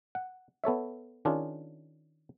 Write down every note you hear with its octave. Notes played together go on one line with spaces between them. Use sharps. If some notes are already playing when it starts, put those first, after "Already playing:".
F#5
B3 A4 C#5 E5
D#3 C#4 D4 F4 G#4